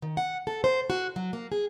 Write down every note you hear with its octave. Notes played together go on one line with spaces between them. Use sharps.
D#3
F#5
A4
C5
F#4
F#3
A#3
G#4